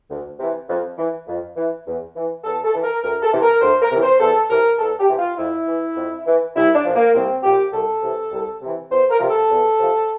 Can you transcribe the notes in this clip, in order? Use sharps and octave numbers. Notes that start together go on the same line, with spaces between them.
D2
C3 E3
F2
E3
F2
E3
E2
E3
E2 A4
A4
E3
A#4
D2 A#4
A4
C3 E3
A#4
D2 C5
A#4
C3 E3
C5
E2 A4
C3 E3 A#4
E2 A4
G4
C3 E3
F4
F2 E4
E3
F2
E3
C2 E4
D4
A#2 F3
A#3
C2 C4
A#2 F3 G4
C2 A4
C3 E3
C2
C3 E3
E2 C5
A#4
C3 F3
A4
E2
C3 F3